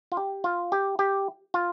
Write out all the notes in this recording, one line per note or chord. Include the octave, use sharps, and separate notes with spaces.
F4
G4
F4
G4
G4
F4